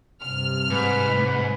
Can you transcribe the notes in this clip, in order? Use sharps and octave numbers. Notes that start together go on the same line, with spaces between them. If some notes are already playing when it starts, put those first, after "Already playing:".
G2 C3 F6
G#2 B4